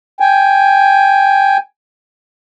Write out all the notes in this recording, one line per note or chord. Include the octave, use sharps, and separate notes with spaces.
G5 G#5